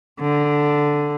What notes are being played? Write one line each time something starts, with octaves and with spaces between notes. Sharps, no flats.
D3